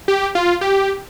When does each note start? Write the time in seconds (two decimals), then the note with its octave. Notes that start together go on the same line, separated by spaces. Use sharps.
0.08 G4
0.35 F4
0.61 G4